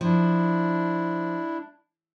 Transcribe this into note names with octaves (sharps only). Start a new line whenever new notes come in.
F3 D4 E4